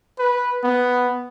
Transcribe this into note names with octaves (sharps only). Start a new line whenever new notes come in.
B4
B3